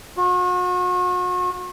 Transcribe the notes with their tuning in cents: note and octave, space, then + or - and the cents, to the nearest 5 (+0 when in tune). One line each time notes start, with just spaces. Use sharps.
F#4 -40